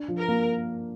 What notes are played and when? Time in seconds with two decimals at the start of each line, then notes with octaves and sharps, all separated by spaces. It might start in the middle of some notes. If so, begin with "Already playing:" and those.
Already playing: D4
0.08 F3
0.18 A#4
0.28 A#3